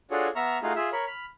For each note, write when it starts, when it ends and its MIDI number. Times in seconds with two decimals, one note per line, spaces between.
0.11 0.28 62
0.11 0.28 65
0.11 0.28 66
0.11 0.28 68
0.11 0.28 69
0.11 0.28 73
0.36 0.58 59
0.36 0.58 76
0.36 0.58 82
0.36 0.58 85
0.36 0.58 89
0.63 0.73 57
0.63 0.73 63
0.63 0.73 65
0.63 0.73 66
0.63 0.73 68
0.63 0.73 77
0.76 0.90 65
0.76 0.90 68
0.76 0.90 76
0.92 1.05 70
0.92 1.05 73
0.92 1.05 83
1.07 1.26 83
1.07 1.26 89